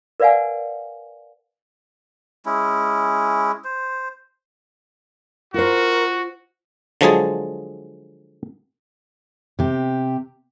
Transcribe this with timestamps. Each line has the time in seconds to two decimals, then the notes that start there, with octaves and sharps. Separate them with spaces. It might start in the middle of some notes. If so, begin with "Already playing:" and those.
0.20 A#4 B4 D5 F5 F#5 G#5
2.46 G#3 C#4 E4
3.64 C5
5.54 F4 F#4 A#4 C5
7.01 D3 F3 F#3 G#3 G#4 A5
9.59 C3 G4